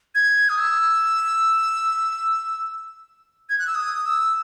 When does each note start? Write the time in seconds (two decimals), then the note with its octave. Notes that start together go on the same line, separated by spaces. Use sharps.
0.15 G#6
0.49 D#6
0.59 E6
3.49 G#6
3.59 F#6
3.67 E6
3.75 D#6
4.06 E6